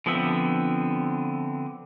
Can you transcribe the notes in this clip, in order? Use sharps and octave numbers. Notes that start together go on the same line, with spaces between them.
D3 F3 B3 C4 E5